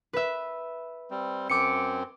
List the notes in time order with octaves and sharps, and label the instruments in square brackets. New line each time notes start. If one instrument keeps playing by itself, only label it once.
[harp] B4 E5
[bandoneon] G3 C4
[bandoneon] F#2 C4 [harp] D6 C#7